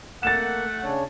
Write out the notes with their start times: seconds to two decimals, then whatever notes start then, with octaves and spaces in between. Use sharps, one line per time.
0.23 A3 A#3 F#5 A6 E7
0.84 C#3 D4 C#5